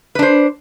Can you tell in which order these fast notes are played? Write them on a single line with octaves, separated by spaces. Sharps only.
B4 D4 C5